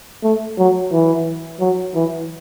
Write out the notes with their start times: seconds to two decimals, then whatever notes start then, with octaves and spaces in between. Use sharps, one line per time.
0.23 A3
0.58 F#3
0.92 E3
1.60 F#3
1.95 E3